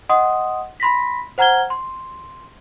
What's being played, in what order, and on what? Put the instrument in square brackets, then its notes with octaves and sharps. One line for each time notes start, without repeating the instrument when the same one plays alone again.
[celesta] D#5 F#5 C6 D#6
B5 C6 A#6 B6
C5 F#5 A#5 F6 G#6 G7
C6